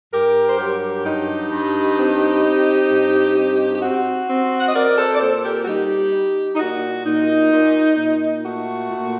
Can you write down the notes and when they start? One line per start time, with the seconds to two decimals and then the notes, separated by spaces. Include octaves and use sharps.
0.12 G2 G4 A#4
0.48 C5
0.58 F#3 G4 A#4
1.05 G2 D#4 G4
1.51 G2
1.97 C4
2.43 C4
2.90 G2
3.36 C4
3.75 G4
3.82 C4 F#4
4.28 C4
4.60 F#5
4.67 D#5
4.74 C4 A#4 D5
4.97 A4 C5
5.15 D5
5.20 A#2 A4 C5
5.44 G4 A#4
5.63 F#4
5.67 G3 D#4 G4
6.13 D#4
6.54 D#4
6.59 A#2 F#4
7.06 A#2 D#4
7.51 A#2
7.98 A#2
8.44 A3 F#4
8.90 A#2